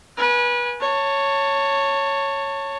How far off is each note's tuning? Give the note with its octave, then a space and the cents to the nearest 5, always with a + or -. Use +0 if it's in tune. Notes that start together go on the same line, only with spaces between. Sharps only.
B4 -30 G#5 +0
C#5 +0 A5 +25